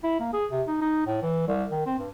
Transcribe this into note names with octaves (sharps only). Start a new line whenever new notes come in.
E4
A#3
G#4
C3
D#4
D#4
A2
E3
C2
D#3
C4
G2